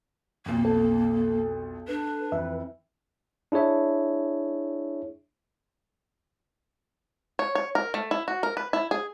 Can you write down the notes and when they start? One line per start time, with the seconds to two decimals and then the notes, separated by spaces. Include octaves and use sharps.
0.46 B1 F2 A#3
0.65 A4
1.88 D4 B4
2.32 F2 E3 E5
3.52 D4 E4 G#4 C#5 E5
7.39 C#5
7.55 C#5
7.75 A#4
7.94 A3
8.11 E4
8.28 F#4
8.43 A#4
8.57 B4
8.73 E4
8.91 G#4